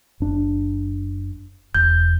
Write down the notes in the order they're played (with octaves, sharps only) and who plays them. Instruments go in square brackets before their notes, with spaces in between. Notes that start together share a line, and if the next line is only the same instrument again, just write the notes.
[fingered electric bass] F#1 D4
[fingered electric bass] E1 [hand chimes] G6